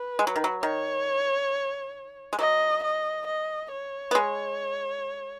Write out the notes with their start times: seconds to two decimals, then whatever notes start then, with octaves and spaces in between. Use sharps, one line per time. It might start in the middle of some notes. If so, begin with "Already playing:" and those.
Already playing: B4
0.19 G#3
0.27 F#3
0.36 D#3
0.44 F#3
0.62 D#3 C#5
2.33 G#3
2.39 F#3 D#5
2.84 D#5
3.27 D#5
3.72 C#5
4.11 B3
4.15 G#3